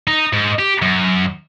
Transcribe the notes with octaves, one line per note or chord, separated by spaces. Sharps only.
D#4
G#2
G4
F#2